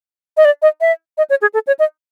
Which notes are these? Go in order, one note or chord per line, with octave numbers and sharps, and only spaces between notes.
D#5
D5
D#5
E5
D#5
C#5
G#4
A4
C#5
D#5